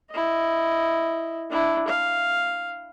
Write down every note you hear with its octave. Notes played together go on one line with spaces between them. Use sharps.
E4 D#5
D4 E4
F5